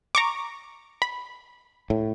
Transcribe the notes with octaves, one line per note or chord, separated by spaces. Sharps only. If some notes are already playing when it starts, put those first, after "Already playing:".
A#5 C#6 D6
B5
A2